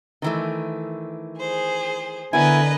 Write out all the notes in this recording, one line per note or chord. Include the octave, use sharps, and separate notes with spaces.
D#3 E3 A3
G#4 C5
D3 B3 E4 A#4 B4 D#5 G#5